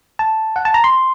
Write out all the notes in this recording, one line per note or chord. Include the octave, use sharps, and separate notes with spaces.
A5
F#5
A5
A#5
C6